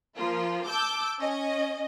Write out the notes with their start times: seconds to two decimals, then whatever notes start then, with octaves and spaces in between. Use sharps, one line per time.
0.16 F3 A#3 F4
0.69 A5 D6 E6 G6
1.20 C#4 D#5